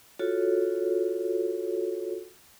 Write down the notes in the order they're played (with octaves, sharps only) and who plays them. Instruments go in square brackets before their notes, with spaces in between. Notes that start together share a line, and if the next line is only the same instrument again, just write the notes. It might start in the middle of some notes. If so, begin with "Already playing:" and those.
[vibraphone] F4 F#4 A4 C#5